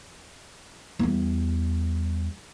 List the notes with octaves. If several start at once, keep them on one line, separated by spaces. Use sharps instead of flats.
E2 G3